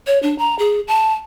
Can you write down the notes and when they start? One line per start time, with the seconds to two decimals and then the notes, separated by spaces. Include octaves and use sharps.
0.07 C#5
0.23 D4
0.38 A#5
0.59 G#4
0.88 A5